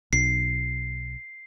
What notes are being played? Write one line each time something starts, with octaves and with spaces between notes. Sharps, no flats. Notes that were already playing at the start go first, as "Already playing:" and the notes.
B1 C7